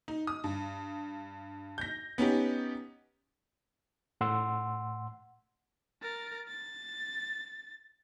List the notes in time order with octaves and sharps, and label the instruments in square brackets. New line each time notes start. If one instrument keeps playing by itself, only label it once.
[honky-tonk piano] D#4
D#6
G2
G6 A#6
B3 C#4 D#4 G4
[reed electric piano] A2 F#5 C6 E6
[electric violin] A#4 A6
A6